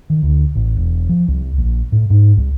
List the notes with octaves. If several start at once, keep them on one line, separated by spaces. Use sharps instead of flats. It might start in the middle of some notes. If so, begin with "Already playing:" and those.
D#3
D2
A1
E1
F3
C2
A#1
A2
G#2
C2